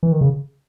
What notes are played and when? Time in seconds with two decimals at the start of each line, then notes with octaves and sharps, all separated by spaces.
0.03 E3
0.12 D#3
0.21 C#3